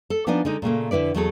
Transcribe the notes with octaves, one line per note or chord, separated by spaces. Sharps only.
A4
F3 B3 D4 D#4 D5 G#5
D3 G#3 D#4 A#4
A#2 C#3 A3 A#3
F2 D3 E4 B4 D5
E2 F#3 A3 F#4 G#4 A4